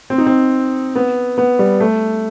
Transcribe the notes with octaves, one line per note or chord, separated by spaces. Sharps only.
C4
D#4
C4
B3
B3
G3
A3